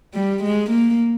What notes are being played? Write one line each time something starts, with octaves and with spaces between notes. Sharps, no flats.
G3
G#3
A#3